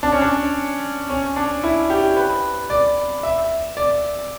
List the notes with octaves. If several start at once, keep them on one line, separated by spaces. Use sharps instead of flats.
D4
C#4
D4
C#4
D4
E4
G4
B4
D5
E5
D5